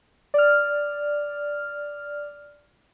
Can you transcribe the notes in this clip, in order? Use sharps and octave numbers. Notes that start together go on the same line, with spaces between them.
D5 F6